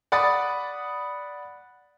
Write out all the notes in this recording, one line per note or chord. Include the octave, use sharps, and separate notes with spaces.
D5 F#5 B5 D#6 A6